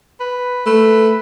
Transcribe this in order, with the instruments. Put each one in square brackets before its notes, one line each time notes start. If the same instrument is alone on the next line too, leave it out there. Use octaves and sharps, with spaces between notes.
[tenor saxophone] B4
[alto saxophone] A3 [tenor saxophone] B4